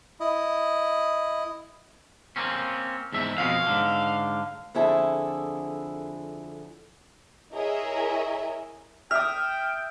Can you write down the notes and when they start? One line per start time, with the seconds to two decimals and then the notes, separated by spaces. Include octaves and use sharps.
0.20 E4 D#5
2.36 A#3 C4 C#4
3.12 E2 G#2 E5
3.38 F2 B2 G#3 F5
3.67 G#2 D3
4.75 F2 D3 E4 G#4 A4
7.52 E4 G#4 A#4 C#5 D#5 E5
9.11 E5 G5 D#6 F6